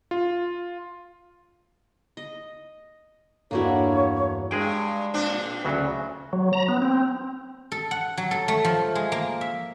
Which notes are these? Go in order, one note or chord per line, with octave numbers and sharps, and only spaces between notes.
F4
D#5
E2 G2 A#3 D4 E4 F#4 A4 C#5
G2 G#3 G#4 G5
A#2 C4 D4
D2 C#3 F#3
F#3
A#5
B3
C4
A4
F#5
F#3
A4
A3
F3
G#3
A#3
E5